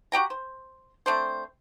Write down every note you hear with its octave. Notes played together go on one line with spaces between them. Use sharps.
F#4 G4 G5 A#5
C5
A3 C4 D4 C5